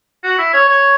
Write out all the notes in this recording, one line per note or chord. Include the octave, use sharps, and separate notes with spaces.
F#4
E4
C#5
C#5